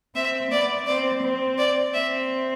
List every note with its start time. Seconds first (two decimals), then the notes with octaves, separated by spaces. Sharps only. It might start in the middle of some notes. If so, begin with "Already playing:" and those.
0.15 C4 E5
0.52 B3 D5
0.87 C4 D5
1.23 C4
1.58 D5
1.94 C4 E5